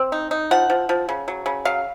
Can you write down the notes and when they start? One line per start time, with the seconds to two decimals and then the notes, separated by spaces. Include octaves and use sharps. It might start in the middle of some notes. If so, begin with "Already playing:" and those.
Already playing: C4
0.12 D#4
0.31 D#4
0.51 F3 F#5
0.70 F3
0.89 F3
1.09 C#3
1.28 F#3
1.46 C#3
1.65 F#3 F5